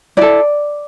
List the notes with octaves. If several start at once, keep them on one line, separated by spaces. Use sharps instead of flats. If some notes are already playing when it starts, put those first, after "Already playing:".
E4 A4 D5